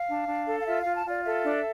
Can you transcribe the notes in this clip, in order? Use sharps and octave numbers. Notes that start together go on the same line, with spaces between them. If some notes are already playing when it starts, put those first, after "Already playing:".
Already playing: F5
D4
D4
A4
F5
F4 E5
F5
F4
A5
F4 D5
A4 E5
D4